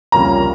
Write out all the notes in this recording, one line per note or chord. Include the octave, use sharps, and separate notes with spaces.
C2 C3 F3 A#3 C#4 A#5